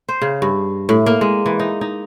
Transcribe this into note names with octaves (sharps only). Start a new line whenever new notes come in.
C5
C#3
G2
A2
A#3
G#3
E3
D#4
D#4